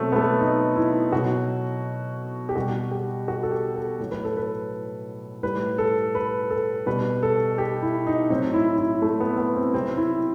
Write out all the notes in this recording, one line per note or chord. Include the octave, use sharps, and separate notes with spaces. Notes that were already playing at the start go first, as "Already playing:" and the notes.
Already playing: B2 F#3 A3 C4
B3
A3
D#4
E4
B2 F#3 F#4
G4
B2 G3 F#4
G4
F#4
A4
G4
A4
A2 F#3
B4
A4
B4
A2 G3 B4
A4
B4
A4
B2 G3 B4
A4
G4
E4
D#4
A2 F#3 C4
E4
E4
A3
B3
B3
C4
C3 F#3 C4
E4